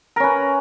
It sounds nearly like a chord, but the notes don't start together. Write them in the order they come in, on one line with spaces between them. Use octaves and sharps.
A#4 C#4 B4